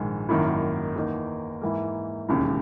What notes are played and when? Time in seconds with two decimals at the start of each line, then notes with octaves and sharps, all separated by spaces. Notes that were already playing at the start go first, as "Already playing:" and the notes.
Already playing: A#1 G#2 D#3 G#3
0.29 G#1 F#2 D#3 A#3 E4
0.95 E2 D#3 A#3 D#4
1.62 G#2 E3 A#3
2.29 E1 D#2 C#3